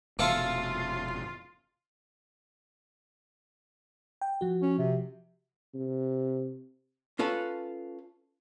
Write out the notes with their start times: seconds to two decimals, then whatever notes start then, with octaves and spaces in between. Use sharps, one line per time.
0.19 F1 B2 A3 F4 A4 F5
4.21 G5
4.41 F3 F#4
4.62 C#4
4.78 C3
5.74 C3
7.19 C#4 F4 A4 B4